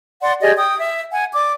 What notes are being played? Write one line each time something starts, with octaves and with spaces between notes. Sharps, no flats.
D5 F#5 C6
G4 G#4 D5 D#5
G5 D#6
E5
F#5 G#5
D5 D6